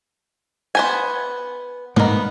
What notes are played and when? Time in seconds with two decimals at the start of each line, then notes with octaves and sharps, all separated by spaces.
0.75 B3 C5 G#5
1.96 G#2 A#3 B3 D#4